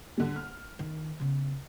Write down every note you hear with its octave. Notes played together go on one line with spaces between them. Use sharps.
D3 G3
F6
D#3
C#3 B3